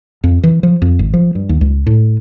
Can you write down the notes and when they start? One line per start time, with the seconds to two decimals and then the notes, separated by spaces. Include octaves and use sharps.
0.24 F2
0.43 E3
0.63 F3
0.82 F2
0.99 G#1
1.14 F3
1.35 G2
1.49 D#2
1.61 C#2
1.86 A2